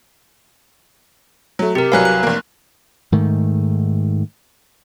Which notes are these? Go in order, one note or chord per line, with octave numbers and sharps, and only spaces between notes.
F#3 A3
C3 G4 A#4
C2 F#3 B4 F5 G#5 F#6
F#6
F1 A#3
G#2 D#3 A3